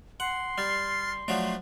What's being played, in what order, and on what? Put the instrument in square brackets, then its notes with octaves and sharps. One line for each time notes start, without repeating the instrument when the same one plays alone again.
[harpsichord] F#5 [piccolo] C6
[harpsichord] G3 [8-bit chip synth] F6 A6 C7
[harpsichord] F3 F#3 D4 [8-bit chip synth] A3